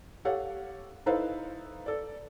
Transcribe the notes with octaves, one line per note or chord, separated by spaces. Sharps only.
G4 A4 C#5 F5 F#5
D#4 E4 A4 B4 C5 F5
A4 D5